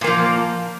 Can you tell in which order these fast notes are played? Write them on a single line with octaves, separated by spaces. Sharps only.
A#2 A#3 F3